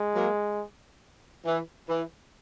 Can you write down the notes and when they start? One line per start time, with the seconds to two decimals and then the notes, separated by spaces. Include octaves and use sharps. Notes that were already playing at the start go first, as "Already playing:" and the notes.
Already playing: G#3
0.15 F#3 A#3
1.45 E3
1.89 E3